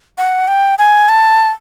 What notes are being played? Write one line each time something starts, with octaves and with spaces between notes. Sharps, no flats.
F#5
G5
G#5
A5